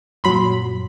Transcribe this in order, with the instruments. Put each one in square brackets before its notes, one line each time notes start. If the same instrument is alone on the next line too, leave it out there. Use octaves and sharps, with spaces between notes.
[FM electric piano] F#2 A#2 [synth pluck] F#3 B5 C6